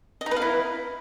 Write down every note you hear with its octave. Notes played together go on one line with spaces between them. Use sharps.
D#5
D#4
B4
F5
E4